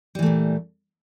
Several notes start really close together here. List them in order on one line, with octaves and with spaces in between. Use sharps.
G3 E3 A3 A#2